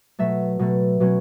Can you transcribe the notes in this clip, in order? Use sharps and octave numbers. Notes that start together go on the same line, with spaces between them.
B2 F#3 A3 E5
B2 F#3 A3
B2 F#3 C#4